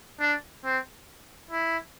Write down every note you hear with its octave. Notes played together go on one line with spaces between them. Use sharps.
D4
C4
E4